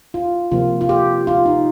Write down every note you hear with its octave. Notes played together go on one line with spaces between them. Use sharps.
F4
C3 F3 A#3 F4
F4
G4
F4
D#4